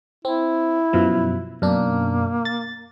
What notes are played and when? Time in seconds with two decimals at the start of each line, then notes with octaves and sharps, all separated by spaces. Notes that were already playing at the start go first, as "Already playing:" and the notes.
0.25 C4 E4
0.93 F#2 B2 F3
1.62 F#2 B2 A#3 D4
2.45 A6